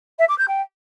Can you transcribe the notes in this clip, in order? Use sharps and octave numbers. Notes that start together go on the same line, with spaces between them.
E5
D6
G6
G5